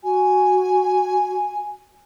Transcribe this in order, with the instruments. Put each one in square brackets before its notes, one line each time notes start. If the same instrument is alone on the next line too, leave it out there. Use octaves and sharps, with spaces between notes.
[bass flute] F#4 [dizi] G#5